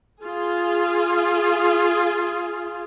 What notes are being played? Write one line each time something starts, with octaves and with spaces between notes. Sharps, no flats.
F4 G#4